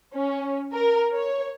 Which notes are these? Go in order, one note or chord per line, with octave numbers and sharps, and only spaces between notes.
C#4
A#4
C#5